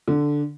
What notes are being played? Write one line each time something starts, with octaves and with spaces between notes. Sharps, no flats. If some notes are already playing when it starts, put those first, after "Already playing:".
D3